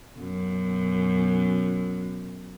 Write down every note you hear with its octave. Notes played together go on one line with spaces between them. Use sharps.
F#2 B2